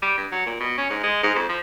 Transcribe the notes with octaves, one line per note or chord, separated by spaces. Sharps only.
G3
G2
F#3
A#2
B2
C#4
G#2
G#3
G#2
F2
F3